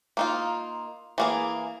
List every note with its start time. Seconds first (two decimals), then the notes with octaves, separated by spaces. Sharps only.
0.17 A#3 D#4 F4
1.18 E3 A#3 G#4